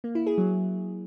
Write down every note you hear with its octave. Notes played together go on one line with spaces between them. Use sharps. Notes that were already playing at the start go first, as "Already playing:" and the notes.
A#3
E4
G#4
F#3